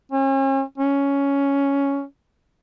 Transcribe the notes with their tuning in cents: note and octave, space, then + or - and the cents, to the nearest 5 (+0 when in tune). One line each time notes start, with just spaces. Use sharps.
C#4 -40
C#4 +10